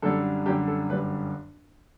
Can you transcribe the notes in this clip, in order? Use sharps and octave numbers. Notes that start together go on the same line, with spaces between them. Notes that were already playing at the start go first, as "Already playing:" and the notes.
F#2 D3 G3 A4
F#2 D3 G3 G4
A4
G1 F#2 D3 G3 B4